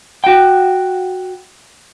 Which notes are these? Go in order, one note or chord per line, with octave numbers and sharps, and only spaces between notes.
F#4 G5